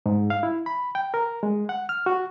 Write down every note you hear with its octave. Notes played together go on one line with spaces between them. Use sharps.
G#2
F5
E4
B5
G5
A#4
G#3
F#5
F6
F#4